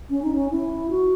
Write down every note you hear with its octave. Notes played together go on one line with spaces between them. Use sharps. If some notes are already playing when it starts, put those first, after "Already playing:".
C#4
D#4
C#4
E4
F#4